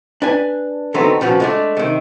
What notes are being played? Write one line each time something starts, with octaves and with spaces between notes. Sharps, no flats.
D4 B4 G#5
D3 F#3 A3 B3 C4 D#4
A#2 C#3 F3 B3 F#4
G#3 A3 D4
C3 D#3